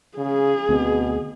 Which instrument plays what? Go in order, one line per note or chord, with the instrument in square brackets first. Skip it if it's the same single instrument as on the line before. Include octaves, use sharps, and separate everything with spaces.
[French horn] C#3 [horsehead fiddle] G#4
[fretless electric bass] D2 C4 [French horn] B2